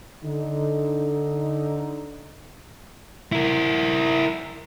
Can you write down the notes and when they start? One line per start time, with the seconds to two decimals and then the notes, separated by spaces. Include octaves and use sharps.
0.24 D3 D#4
3.32 E4 A#4